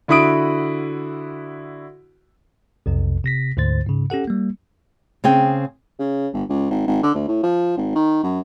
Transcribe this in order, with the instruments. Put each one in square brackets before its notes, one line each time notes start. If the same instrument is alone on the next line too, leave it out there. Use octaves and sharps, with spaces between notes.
[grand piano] D3 E4 F#4 B5 D#6 D7
[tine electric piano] B1 F2 C3
C3 A#6 B6
D2 G#2 D3 C5 A6
G#2 C#3
C#4 G4 A4 F#5
G3 A#3
[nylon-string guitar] C#3 C4 G#4 G5
[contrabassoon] C#3
G1
C#2
G#1
G#1
D3
D2
A2
F3
G#1
D#3
F#2